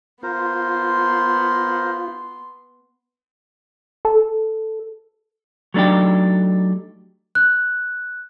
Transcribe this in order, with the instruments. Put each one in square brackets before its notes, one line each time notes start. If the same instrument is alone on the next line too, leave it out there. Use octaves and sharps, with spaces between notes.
[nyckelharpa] B3 C6 [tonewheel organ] F4 [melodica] A#4 C5
[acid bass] A4
[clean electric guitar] F#3 A3 D4 D#4 G4
[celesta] F#6